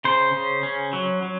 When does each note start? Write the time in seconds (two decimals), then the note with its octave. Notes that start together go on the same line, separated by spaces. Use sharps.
0.04 C#3 C5
0.33 C#3
0.63 C#4
0.93 F#3
1.23 F#3